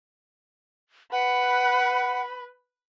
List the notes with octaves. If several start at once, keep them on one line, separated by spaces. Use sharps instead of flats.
B4 F#5 B5